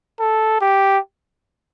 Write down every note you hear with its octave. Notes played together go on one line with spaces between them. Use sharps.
A4
G4